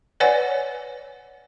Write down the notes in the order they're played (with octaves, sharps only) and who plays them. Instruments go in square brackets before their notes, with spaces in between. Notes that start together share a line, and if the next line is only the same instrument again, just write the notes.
[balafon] B4 C#5 D5 F#5 G#5